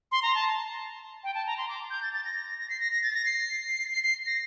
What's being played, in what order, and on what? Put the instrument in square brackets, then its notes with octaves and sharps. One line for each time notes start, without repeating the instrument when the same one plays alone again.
[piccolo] C6
A#5
A5
G5
A5
A#5
C6
D6
G6
A6
A6
A#6
A#6
C7
A#6
A#6
A6
A#6
C7
C7
C7
A#6